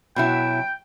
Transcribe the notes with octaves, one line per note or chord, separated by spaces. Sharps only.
B2 F#3 E4 G5